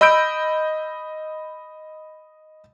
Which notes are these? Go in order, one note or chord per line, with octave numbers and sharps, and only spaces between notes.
D#5 B5 E6 G6 D7